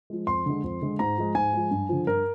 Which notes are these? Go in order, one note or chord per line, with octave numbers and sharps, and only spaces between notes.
F3 G#3
F2 C6
D3 G#3
F2
D3 G#3
G#2 A#5
F3 G#3
G#2 G#5
F3 G#3
G2
D3 F3
G2 A#4